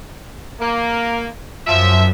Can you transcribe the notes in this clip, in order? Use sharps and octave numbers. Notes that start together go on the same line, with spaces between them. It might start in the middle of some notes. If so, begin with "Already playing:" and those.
A#3
F#2 F3 E5